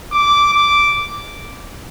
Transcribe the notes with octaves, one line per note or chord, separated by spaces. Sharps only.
D6
D6